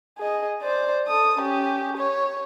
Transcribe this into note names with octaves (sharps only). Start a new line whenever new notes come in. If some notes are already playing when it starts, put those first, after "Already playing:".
G#4 D#5
C5 D5
A4 D#6
C#4 G4
C#5